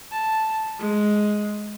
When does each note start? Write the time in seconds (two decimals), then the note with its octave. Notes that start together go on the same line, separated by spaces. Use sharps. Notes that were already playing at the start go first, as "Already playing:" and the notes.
0.12 A5
0.80 G#3